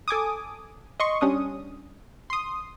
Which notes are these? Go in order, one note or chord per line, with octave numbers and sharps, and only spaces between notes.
A4 G#5 D6 D#6
D#5 C6 C#6
G3 C#4 D4 D#6
C6 D#6